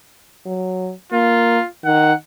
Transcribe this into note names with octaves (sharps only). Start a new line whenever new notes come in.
F#3
A#3 F4
D#3 F#5